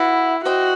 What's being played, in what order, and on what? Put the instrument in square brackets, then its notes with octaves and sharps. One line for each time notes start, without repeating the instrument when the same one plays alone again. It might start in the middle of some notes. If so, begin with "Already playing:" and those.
Already playing: [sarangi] E4 [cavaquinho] F#4 B4 F#5
[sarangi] F#4 [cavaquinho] C5 D#5 G5